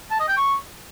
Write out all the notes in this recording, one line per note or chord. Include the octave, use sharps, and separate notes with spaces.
A5
D#5
G5
C#6